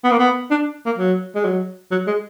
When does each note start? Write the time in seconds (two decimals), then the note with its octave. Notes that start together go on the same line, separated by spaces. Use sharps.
0.04 B3
0.11 A#3
0.19 B3
0.51 D4
0.86 A#3
0.98 F#3
1.35 G#3
1.45 F#3
1.91 F#3
2.07 G#3